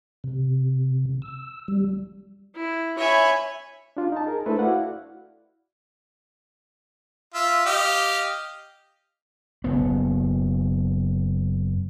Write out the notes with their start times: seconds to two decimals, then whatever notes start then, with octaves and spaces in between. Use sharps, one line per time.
0.24 C3
1.22 E6
1.68 G3
2.56 E4
2.98 C#5 E5 G#5 B5
3.97 D4 F4
4.12 D#4 A5
4.26 G#4 A#4
4.46 A3 D4 E4 A4 B4 C5
4.59 E4 F#4 D5 F5 F#5
7.34 F4 E5
7.66 G4 D#5 F5
9.64 F#1 B3